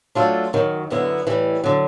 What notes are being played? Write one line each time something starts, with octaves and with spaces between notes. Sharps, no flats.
F#3 A3 D4 F4 A4
F#2 D#3 F#3
F#2 D3 F#3 B3 E4
A2 E3 G3
D3 F#3